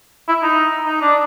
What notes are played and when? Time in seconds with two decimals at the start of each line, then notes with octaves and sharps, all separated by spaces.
0.28 E4
0.43 D#4
0.86 D#4
1.01 D4